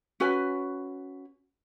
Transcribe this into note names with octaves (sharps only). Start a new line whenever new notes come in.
C#4 F#4 B4 G#5